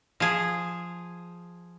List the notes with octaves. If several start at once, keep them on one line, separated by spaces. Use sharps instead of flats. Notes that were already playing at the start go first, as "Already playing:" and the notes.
F3 G#4